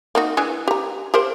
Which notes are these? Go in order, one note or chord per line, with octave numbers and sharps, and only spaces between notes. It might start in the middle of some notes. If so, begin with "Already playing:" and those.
A#3 D#4 F#4
E3 D4 G#4
G4 A#5
G4 A#4 C5